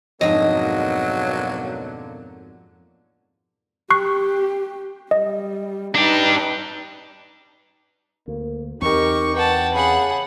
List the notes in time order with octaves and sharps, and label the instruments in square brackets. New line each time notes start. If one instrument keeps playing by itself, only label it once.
[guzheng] F2 G#2 [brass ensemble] B2 D3 A#3 [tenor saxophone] F#3 [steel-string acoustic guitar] D#5
[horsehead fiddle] G4 [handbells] C#6 F#6 C7
[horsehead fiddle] G3 [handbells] D#5
[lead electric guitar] D4 G4 [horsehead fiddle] D#4 B4
[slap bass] D2 [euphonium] A#3
[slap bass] E2 C4 [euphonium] D#4 [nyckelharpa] G4 A#4 [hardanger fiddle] C#6
[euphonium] B4 [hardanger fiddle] F#5 A5 [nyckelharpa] G5
[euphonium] C#3 [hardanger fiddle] G#4 F#5 [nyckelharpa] B5